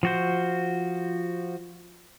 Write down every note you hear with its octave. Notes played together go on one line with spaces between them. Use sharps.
F3 F#4 C5